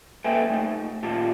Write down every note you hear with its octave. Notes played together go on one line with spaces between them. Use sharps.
A#3 A4 B4 E5 G5 G#5
A3 D#4
A#2 F4 G4 A5